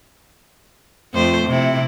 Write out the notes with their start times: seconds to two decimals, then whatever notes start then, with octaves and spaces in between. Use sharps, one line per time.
1.14 F2 A3 C5
1.47 C3 E4